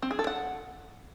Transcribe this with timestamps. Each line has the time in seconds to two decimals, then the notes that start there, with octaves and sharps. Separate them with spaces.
0.02 C4
0.11 G#4
0.19 A4
0.27 F#5